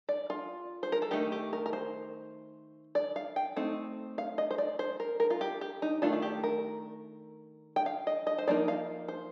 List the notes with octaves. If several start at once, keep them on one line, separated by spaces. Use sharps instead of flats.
D5
F4
C5
A#4
A4
D#3 A3 D#4 G4
G4
A#4
A#4
C5
D5
F5
G5
A3 C4 D#4
F5
D#5
C5
D5
C5
A#4
A#4
F4
G4
G4
D#4
D#3 A3 D4 F4
F4
G4
A#4
G5
F5
D#5
D#5
C5
F3 A#3 D#4 D5
F5
C5